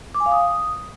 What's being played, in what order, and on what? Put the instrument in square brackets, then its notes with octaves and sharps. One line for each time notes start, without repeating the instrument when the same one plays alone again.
[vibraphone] D6
G#5
F5
D#6